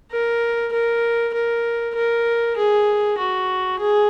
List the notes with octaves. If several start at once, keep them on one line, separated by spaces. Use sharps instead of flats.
A#4
A#4
A#4
A#4
G#4
F#4
G#4